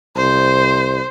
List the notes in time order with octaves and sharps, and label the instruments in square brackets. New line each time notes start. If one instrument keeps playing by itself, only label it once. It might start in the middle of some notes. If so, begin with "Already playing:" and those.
[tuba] C2 [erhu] C5